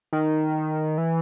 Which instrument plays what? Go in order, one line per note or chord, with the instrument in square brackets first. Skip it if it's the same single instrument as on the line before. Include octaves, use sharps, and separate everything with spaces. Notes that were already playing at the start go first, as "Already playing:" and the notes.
[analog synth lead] D#3
E3